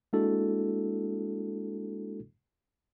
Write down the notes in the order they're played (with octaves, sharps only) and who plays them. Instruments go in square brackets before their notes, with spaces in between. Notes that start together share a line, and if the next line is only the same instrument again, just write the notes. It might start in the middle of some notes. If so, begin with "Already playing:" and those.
[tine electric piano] G#3 A#3 D4 E4 F#4 A4